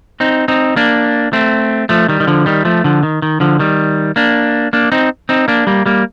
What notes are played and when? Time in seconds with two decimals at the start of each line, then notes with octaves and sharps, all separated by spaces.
0.20 C4 D#4
0.48 C4 D#4
0.76 A#3 D4
1.33 A3 C4
1.89 F3 A3
2.08 D#3 G3
2.20 D#3
2.27 D3 F3
2.46 D#3 G3
2.65 F3 A3
2.84 D3 F3
3.03 D#3
3.22 D#3
3.40 D3 F3
3.59 D#3 G3
4.16 A#3 D4
4.73 A#3 D4
4.92 C4 D#4
5.29 C4 D#4
5.48 A#3 D4
5.67 G3 A#3
5.86 G3 A#3